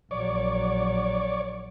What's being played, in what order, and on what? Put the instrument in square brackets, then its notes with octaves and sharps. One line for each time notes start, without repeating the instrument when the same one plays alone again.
[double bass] A#1 F#3 [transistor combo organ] C#5 D5